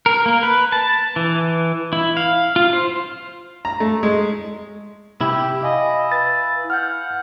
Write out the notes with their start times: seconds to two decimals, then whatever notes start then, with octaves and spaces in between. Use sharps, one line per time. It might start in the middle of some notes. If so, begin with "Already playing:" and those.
0.06 A#4
0.26 A#3
0.43 B4
0.72 A5
1.16 E3
1.93 E4
2.17 F5
2.56 F4
2.73 C5
3.65 A#5
3.80 A3
4.03 G#3
5.21 C3 E4 G4
5.63 D#5 F5 G#5 B5
6.12 B4 A6
6.70 F#5 F6 G6